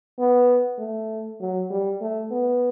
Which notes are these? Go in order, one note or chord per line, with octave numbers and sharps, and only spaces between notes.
B3
A3
F#3
G3
A3
B3